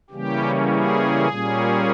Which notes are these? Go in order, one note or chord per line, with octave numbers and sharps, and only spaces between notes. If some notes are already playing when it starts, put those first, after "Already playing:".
C#3 E3 G3 A#3 C#4 G4
G#4
A#2 G3 A#3 C#4